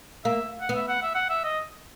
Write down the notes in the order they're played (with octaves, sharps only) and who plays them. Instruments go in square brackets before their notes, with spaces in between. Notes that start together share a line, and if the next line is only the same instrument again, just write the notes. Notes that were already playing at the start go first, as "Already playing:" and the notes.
[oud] A#3 [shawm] E5
[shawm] F#5
[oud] B3
[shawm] E5
F#5
E5
F#5
E5
D#5